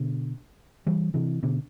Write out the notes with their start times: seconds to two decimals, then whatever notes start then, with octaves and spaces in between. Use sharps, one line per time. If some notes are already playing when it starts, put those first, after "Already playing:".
Already playing: B2 D3
0.86 E3 G3
1.14 C3 E3
1.43 B2 D3